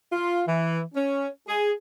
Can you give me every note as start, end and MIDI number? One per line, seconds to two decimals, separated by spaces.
0.12 0.42 65
0.48 0.81 52
0.95 1.28 61
1.48 1.72 68